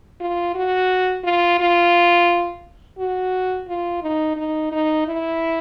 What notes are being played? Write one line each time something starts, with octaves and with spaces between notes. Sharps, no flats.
F4
F#4
F4
F4
F#4
F4
D#4
D#4
D#4
E4